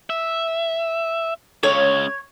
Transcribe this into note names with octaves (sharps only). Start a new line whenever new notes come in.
E5
C#2 C#3 C#5